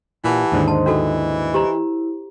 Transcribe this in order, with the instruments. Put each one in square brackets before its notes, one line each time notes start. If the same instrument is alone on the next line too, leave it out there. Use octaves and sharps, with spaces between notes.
[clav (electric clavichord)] A#2 [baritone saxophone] E3 [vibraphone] G4 F#5 A5
[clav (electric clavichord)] D#2 G#2 D3
[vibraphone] C5 D#5 C6 [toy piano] A5
[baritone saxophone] E3 [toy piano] C#4 F#4 A4 [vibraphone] D#5
[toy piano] G4 C5 A#5
[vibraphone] E4